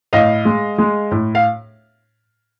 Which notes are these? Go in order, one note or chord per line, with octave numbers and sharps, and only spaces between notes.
A2 D#5 F5
G#3
G#3
A2
F5